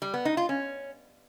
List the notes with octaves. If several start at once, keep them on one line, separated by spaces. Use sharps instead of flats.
G3
B3
D#4
F4
C#4